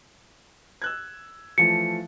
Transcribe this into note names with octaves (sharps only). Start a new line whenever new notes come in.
E6 F#6 G#6
E3 F3 A3 C#7